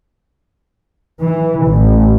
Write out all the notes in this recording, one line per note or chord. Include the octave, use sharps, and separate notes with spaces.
E3
A1